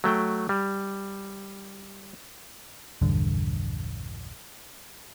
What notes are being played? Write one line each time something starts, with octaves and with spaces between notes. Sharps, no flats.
F#3 A3 G5
G3
A#1 E2 G2 D3